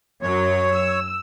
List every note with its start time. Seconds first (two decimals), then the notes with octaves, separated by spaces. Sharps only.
0.22 F#2 F#3 C#5
0.74 E6